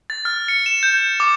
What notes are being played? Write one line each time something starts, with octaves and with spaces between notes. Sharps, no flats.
A6
F6
C#7
E7
G6
E7
D6